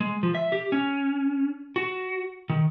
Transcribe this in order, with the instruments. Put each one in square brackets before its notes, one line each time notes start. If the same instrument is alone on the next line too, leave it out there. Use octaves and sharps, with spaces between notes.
[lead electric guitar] G#3
F3
E5
G4
C#4
F#4
D#3